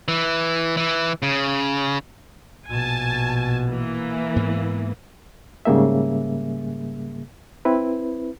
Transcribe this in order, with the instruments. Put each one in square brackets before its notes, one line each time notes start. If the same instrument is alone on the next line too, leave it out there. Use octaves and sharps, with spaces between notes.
[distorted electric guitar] E3
E3
C#3
[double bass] A#1 B2 [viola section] G#5 A5
[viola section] E3 A#3
[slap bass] G#2 B3
[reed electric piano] G#2 C#3 G3 A#3 G#4 E5
C4 E4 B4